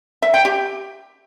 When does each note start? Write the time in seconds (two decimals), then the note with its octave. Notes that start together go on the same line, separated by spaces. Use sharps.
0.22 E5
0.34 G5
0.45 G4